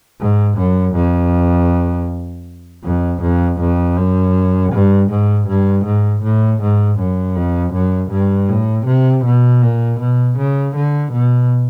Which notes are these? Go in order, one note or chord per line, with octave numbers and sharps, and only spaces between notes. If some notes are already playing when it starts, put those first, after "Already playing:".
G#2
F#2
F2
F2
F2
F2
F#2
G2
G#2
G2
G#2
A2
G#2
F#2
F2
F#2
G2
A2
C3
B2
A#2
B2
C#3
D3
B2